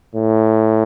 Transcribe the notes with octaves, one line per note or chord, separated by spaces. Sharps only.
A2